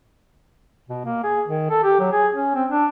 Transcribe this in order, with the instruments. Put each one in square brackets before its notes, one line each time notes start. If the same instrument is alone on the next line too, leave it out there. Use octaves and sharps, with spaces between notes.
[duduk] B2
A#3
G#4
D#3
A4
G4
F#3
G#4
C#4
C4
D4